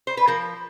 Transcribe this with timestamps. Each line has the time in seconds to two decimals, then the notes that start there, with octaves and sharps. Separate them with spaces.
0.07 C5
0.17 B4
0.27 F3 A#4